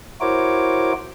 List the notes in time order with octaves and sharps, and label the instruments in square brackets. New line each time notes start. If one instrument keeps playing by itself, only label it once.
[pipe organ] E4 F#4 A#4 C5 C#5 D6